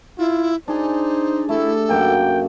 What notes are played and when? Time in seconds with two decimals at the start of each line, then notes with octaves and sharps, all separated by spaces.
0.19 E4 F4
0.68 D4 D#4 G#4 C5 D5
1.49 A3 E4 G4 A4
1.89 F#2 A#3 F#5 G5